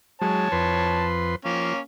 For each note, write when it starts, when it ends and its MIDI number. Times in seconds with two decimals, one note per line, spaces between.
0.21 0.48 54
0.21 0.48 56
0.21 1.08 73
0.21 1.08 81
0.52 1.36 41
0.52 1.36 71
0.52 1.36 84
1.45 1.73 53
1.45 1.79 58
1.45 1.79 61